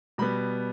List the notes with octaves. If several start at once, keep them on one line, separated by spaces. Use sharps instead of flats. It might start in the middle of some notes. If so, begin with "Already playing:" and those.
B2 G3 B3 B5